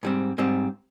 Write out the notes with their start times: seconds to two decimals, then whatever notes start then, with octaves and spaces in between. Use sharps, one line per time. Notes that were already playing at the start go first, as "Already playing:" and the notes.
0.03 G#2 G3 C4
0.38 G#2 G3 C4